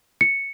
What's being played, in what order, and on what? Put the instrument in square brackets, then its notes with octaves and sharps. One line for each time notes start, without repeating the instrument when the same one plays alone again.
[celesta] C#7